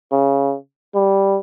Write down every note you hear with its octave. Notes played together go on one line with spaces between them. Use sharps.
C#3
G3